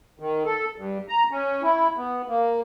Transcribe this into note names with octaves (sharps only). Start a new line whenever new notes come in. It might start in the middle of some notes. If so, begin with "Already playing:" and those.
D#3
A4
G2
A#5
C#4
E4
B3
A#3